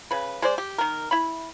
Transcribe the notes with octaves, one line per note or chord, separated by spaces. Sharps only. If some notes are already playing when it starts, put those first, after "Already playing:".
C#3 B4
G#3 C5 D5
G4
D#3 A#4
E4 B5